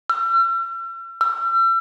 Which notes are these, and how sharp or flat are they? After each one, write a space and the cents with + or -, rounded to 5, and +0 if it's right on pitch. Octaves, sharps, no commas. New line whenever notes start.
E6 +45
E6 +40